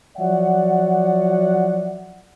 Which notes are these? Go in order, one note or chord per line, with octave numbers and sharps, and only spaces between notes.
F3 F#3 C#5 D5 E5 F#5